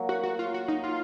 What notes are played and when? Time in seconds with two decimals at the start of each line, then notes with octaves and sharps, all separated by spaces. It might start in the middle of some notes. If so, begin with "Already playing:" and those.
Already playing: F#3 A#3
0.09 F#4
0.23 F#4
0.39 F4
0.54 F#4
0.68 D#4
0.84 F4